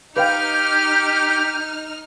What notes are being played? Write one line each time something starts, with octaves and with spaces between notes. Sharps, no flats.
D#4 G4 B4 F5 G5 F6 G6